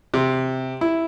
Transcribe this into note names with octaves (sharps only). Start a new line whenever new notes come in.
C3
E4